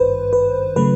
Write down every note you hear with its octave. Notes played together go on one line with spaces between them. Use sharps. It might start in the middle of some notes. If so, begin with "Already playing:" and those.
Already playing: G#1 G2 D#3 B4 C5
B4
C#3 F#3 A3 B4